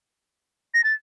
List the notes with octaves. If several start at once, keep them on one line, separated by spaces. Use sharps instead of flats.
A#6
A6